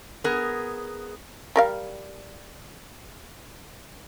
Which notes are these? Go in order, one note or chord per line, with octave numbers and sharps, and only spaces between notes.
B3 G#4 A#4
G3 A#4 F5